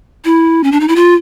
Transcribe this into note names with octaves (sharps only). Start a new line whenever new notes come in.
E4
C#4
D4
D#4
E4
F4